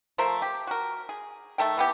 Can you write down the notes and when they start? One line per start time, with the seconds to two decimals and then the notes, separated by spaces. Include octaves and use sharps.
0.18 F3 A3 A#4 C5
0.42 G4
0.67 F#4 A#4
1.09 G#4
1.58 D#3 A3 A4 G5
1.77 E3 B3 G4